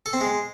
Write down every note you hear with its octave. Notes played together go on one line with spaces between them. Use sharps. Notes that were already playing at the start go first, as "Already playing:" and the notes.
A4
C4
G#3